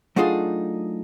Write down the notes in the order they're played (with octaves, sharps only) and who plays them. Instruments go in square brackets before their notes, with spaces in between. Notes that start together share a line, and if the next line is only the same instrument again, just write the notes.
[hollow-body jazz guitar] F#3 A3 D4 D#4 F4 G#4